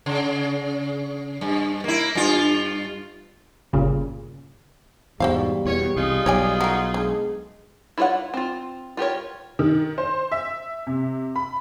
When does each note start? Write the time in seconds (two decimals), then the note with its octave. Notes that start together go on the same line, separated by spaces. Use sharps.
0.06 C#3
1.41 G2
1.84 A#3 E4
2.15 G2 F4
3.73 G1 A#2 C#3
5.20 E2 G#2 B2 G3 F#4 C5 F5
5.65 E2 B2 C#5
5.96 C2 D#4 F4 G#4
6.26 B1 C#5 D5 G#5
6.61 F#4 A#4
6.94 D3 G#3
7.98 E4 F4 G#4 C#5 F#5
8.34 C4 F4
8.97 F4 G4 A#4 C#5
9.59 D#3
9.98 C5
10.32 E5
10.87 C3
11.36 B5